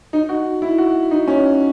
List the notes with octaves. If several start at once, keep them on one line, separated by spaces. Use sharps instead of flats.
D#4
F#4
E4
F#4
D#4
C#4